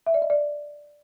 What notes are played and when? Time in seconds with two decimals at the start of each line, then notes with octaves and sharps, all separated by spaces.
0.06 E5
0.14 D5
0.22 D#5
0.30 D5